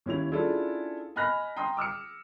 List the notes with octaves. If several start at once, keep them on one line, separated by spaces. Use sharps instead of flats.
D#2 C#4 E4 F7
C#4 D4 E4 F4 G#4 A4
D#5 G#5 B5 F6 F#6 A#6
G5 A#5 C6 D#6
D6 E6 F6 C#7